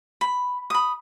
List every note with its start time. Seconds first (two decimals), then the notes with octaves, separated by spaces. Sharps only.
0.21 B5
0.70 B5 D#6